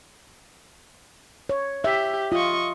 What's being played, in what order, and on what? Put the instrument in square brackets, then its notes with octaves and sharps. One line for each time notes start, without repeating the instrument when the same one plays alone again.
[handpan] C#5
[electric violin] G4 [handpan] E5
[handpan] F4 [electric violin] D#5 C#6